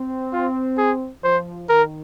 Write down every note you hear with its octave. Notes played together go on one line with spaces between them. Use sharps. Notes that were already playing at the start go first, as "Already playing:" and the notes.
Already playing: C4
F4
G#4
F3 C5
D#3 A#4